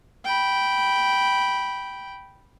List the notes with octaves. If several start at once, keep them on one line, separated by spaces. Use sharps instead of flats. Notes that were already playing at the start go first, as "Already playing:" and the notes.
G5 B5